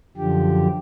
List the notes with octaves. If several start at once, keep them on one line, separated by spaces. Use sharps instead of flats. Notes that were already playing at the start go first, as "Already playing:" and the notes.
F#2 D3 F3 G4